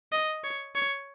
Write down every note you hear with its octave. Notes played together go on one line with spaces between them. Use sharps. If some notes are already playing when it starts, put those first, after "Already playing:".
D#5
C#5
C#5